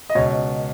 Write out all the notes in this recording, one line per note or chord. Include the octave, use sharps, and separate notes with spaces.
D#5
C#2 B2 C#5